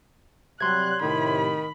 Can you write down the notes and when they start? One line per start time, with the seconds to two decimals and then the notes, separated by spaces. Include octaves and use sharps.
0.61 C3 F#3 G3 C6 F#6 G#6
1.02 A2 C3 D#3 B5